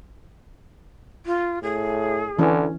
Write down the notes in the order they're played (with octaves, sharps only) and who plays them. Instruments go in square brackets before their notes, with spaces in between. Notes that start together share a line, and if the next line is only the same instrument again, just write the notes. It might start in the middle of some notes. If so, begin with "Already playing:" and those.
[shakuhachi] F4
[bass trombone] A2 [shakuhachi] G#4
[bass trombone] D3 [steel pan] E3 C#4